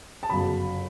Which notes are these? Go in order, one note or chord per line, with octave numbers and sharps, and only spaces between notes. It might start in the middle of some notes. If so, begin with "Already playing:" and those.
A5
G1 F#2 C#3 B5